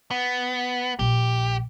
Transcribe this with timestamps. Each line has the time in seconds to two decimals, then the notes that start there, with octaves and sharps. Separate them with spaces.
0.11 B3
0.99 A#1 G4